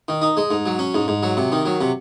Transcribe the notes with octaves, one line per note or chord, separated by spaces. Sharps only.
D#3
D#4
G#3
G#2
F#3
C#4
G#2
G#2
F#3
C3
D#3
F#3
C3